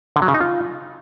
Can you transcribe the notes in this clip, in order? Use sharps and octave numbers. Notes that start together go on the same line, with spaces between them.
D3
F#3
C#3
D#4
F4